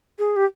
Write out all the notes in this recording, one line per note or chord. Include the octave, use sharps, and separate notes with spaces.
G#4
G4